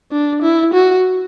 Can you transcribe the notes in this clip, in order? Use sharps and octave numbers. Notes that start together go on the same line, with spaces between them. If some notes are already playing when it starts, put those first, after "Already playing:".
D4
E4
F#4